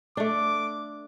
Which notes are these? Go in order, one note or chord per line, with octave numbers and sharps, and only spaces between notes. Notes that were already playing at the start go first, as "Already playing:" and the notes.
A3 D4 D6